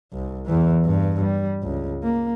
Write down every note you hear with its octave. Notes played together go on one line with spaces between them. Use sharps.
C2
E2 E3
G2
G3
C#2
A#3